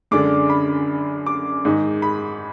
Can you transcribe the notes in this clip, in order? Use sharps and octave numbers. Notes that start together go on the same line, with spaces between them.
F#2 D3 G#3 D4 D6
B5
D6
G#2 D#3 G#3 D#4
B5